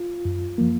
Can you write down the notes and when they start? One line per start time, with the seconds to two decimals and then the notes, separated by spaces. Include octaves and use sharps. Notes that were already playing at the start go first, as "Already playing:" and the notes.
Already playing: F4
0.25 F#2
0.58 F3 A#3